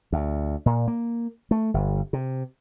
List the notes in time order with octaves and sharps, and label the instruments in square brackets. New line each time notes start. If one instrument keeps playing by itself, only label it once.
[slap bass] D2
A#2
A#3
A3
G1
C3